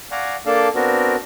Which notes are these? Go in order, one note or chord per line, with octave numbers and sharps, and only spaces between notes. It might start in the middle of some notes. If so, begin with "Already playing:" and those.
D5 F5 F#5 G#5 A#5 C#6
A#3 D4 A4 D5 F5 A5
B3 C4 D4 F#4 A#4